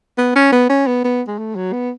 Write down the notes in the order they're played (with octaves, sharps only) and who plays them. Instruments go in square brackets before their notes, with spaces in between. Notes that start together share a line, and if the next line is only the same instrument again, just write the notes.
[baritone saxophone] B3
C#4
B3
C#4
B3
B3
G#3
A3
F#3
B3